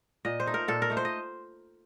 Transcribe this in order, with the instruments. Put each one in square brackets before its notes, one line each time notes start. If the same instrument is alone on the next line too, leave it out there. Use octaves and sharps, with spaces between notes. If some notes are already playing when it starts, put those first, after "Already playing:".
[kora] A#2 D#5
C5
A3 D#4
A#4
A#2 A4
A#4
A3 D#4
C5
D#5